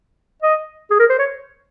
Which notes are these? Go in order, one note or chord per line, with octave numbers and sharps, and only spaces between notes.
D#5
G#4
A#4
C5
C#5